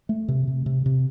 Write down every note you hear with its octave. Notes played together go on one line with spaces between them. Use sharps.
A3
C3
C3
C3
C3